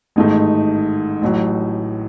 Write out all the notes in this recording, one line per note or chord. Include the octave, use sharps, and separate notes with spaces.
A1 G#2 D#3 A3 D#4
A1 A2 F#3